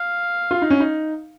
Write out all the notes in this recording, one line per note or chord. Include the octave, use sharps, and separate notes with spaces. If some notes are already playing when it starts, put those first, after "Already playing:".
Already playing: F5
F4
D#4
C#4
D#4